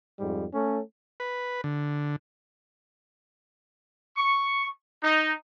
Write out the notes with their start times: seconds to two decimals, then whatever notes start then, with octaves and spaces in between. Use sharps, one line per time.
0.20 F2 G#2 G3
0.53 A3 C#4
1.20 B4
1.64 D3
4.17 C#6
5.02 D#4